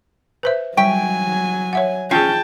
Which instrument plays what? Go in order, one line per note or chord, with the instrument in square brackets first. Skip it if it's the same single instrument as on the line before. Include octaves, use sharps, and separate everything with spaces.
[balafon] B4 C5 E5
[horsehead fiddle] F#3 G#5 [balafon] G3 E5 [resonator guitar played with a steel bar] G5
[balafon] C#5 E5 F#5
[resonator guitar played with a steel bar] C#4 [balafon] F4 G#4 [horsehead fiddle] G5 A5